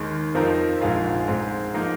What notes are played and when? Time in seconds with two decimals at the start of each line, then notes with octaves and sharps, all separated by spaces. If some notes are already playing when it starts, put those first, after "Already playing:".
Already playing: D#2 D#3 G#3
0.34 F2 F3 C4 D#4 A#4
0.81 A#1 G#2 G#3 F4 G#4
1.27 G#2 G#3 C4
1.74 F3 A#3 D#4